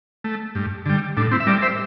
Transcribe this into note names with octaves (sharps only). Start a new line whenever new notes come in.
A3
G2
D3 G3
A2 D4
C4 E4
E5
G3 A#4 D5
C5 E5